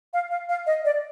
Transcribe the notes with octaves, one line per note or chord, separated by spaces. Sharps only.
F5
F5
F5
D#5
D5